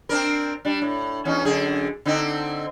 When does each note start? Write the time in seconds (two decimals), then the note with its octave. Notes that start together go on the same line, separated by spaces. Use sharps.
0.09 C4 D4 A#4
0.65 G3 D4
0.82 A2
1.25 E2 C#4 D#4
1.45 F#2 D3 G#4
2.05 D3 C4 D#4